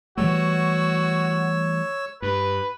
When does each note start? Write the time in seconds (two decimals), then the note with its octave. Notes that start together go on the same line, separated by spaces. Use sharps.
0.18 E3 G3 A3 F#4 C#5 E6
2.22 G2 B4